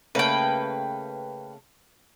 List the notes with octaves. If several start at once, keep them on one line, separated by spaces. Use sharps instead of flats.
C#3 A3 A#3 B4 G5